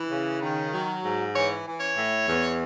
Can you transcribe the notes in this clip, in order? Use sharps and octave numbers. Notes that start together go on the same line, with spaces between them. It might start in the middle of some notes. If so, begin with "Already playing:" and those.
Already playing: E3
C#3
D#3
F#3
G#2
E3 C#5
E3
C#5
A2
E2